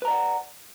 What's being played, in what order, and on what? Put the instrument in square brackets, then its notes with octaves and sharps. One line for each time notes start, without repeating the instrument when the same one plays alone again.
[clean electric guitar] B4
A#5
D5
F#5